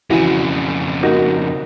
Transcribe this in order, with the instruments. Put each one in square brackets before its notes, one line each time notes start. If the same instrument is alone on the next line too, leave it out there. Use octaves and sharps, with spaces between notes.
[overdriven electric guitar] F2 C#3 [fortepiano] E3 F#4
[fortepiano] A#3 D#4 F#4